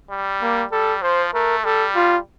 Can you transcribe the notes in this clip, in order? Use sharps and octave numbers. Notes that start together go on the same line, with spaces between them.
G3
A#3
G3 A4
F3 C5
A3 A#4
G3 A4
F4